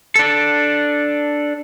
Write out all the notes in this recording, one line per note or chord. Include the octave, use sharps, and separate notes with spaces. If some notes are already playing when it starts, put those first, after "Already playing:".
D4 A4